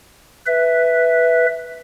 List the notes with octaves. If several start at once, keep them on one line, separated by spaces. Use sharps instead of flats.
B4 E5